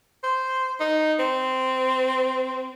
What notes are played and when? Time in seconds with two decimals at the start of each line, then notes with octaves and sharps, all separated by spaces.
0.23 C5
0.80 D#4
1.19 C4